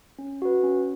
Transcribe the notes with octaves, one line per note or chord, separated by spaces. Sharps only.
C#4
F#4 B4
C#4